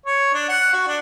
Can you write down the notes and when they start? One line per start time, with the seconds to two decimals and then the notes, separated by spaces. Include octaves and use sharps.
0.06 C#5
0.33 D4
0.49 F#5
0.73 F#4
0.87 D4